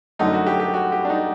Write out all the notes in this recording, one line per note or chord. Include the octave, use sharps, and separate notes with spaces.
F#2 D3 F#3 A3 D#4
F#4
G4
G4
F#4
G4
D4
D#4